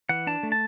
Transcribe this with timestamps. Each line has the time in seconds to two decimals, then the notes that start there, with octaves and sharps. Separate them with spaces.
0.09 E3 F#5
0.27 D4 A5
0.43 A3
0.52 A5